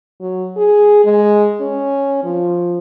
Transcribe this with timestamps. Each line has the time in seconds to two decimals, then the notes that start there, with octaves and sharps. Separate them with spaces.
0.21 F#3
0.57 G#4
1.05 G#3
1.61 C#4
2.24 F3